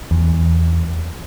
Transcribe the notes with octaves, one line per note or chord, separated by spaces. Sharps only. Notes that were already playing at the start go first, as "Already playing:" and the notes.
E2